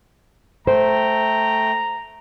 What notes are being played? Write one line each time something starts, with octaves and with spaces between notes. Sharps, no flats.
A3 C5 G5 A#5